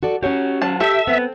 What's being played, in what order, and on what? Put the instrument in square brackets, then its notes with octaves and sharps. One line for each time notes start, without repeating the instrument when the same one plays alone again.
[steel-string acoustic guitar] F#4 A4 D5
[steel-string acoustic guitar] C#4 F#4 [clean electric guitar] G4 C#5
[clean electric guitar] F#3 C5 [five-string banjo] A5
[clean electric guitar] G4 [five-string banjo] A4 [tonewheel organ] E5
[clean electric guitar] B3 [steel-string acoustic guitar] C4